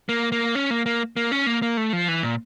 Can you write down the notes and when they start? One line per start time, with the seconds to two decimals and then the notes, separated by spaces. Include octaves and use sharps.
0.09 A#3
0.32 A#3
0.55 C#4
0.70 A#3
0.86 A#3
1.17 A#3
1.32 C#4
1.46 A#3
1.62 A#3
1.77 A3
1.93 F3
2.08 E3
2.23 A#2